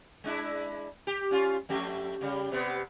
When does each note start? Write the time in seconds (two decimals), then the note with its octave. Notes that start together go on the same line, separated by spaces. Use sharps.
0.24 G#3 D4 E4
1.07 G4
1.31 C#4 F4
1.69 F2 A3 G4
2.21 C#3 G3
2.52 C3 B3